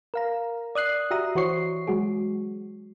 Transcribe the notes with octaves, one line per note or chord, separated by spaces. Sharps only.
A#4 F5 A#5
D5 D#6 F#6 C7
F#4 G4 E5 A#5 D#6
E3 F#4 C5 C#5 C#6 C7
F#3 G#3 F#4 G#4